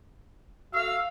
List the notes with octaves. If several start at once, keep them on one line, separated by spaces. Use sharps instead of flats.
A3 F#4 F5 E6